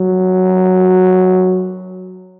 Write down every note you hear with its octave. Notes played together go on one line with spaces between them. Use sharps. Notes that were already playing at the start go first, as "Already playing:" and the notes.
Already playing: F#3